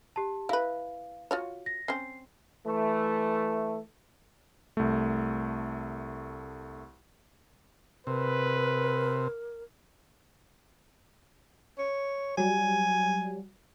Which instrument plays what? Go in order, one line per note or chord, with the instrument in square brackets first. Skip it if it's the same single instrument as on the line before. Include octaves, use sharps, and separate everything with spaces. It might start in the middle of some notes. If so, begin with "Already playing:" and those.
[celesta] G4 A5
[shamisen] E4 B4 [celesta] F5
[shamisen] F4 F#4 C#5
[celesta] A#6
[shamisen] C4 C#4 [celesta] C7
[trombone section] E3 A3
[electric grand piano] C2 A3
[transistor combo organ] C3 [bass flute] A#4 [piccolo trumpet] B4
[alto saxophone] C#5
[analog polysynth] F#3 G3 [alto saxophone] G#5